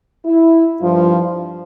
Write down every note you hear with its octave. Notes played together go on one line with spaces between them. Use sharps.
E4
G2 F3 F4